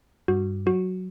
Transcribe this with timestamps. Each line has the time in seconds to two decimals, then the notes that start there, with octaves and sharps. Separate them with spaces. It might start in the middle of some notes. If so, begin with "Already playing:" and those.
0.28 G2 F#4
0.66 F#3 F#4